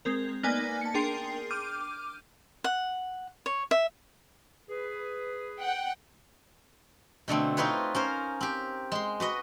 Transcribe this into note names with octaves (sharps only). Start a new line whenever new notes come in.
G#3 C4 A#4
A#3 B3 D#4 D5 G#5
A5 C#7
D4 G#4 A#4 G5 C6 C7
D6 F6 G6 D#7
F#5
C#5
E5
G#4 B4
F#5 G5
B2 D3 A3 C4
C4 D#4 F4 B4 C#5
C#4 A#4 C5
C4 G4
G#3 C6
F#4 B4 D#5